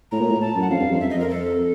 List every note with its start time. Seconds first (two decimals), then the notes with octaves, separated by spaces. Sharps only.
0.12 A2 A#5
0.21 A#2
0.30 A2
0.41 A5
0.55 F#2
0.61 F#5
0.70 F2 F5
0.80 G2
0.91 F2
1.00 E5
1.10 D#5
1.15 F2
1.20 A#4
1.29 A4